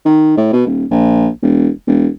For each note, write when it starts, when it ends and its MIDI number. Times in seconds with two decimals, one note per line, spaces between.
0.05 0.36 51
0.37 0.50 45
0.53 0.64 47
0.66 0.85 27
0.91 1.28 34
1.42 1.69 28
1.87 2.08 28